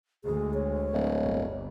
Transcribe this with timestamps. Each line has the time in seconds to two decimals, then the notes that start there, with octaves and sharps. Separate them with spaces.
0.24 D2 G#3 G#4
0.54 C#5
0.94 D1
1.24 G1